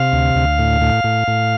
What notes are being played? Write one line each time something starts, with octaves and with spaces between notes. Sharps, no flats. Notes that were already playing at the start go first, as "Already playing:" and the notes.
Already playing: C3 F5
D2
D2
A2
A2
A2
A2